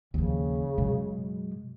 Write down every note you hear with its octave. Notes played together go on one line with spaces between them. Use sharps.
D#2 C#3 E3 F3
F#2 B2 F#3 G#3